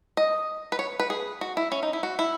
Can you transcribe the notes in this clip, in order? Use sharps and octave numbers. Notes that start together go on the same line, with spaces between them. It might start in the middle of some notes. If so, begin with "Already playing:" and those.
D#5
B4
C#5
B4
G#4
F#4
E4
C#4
D#4
E4
F#4
E4